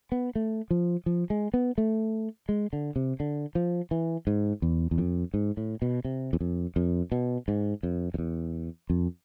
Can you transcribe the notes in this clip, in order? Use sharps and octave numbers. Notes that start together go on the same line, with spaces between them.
B3
A3
F3
F3
G#3
B3
A3
G#3
D3
C3
D3
F3
E3
G#2
E2
E2
F2
G#2
A2
B2
C3
E2
F2
F2
B2
G#2
F2
F2
E2
F2